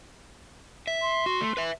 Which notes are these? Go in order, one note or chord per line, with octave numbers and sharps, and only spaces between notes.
E5
C6
F#4
A3
B4 E5